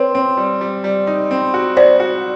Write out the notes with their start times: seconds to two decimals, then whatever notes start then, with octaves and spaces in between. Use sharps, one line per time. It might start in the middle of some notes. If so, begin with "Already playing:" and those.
Already playing: C4 B4 C#5
0.15 C4
0.37 G3
0.61 G3
0.84 G3
1.07 D#4
1.31 C4
1.54 F#4
1.77 F#4 C5 D5
2.00 F#4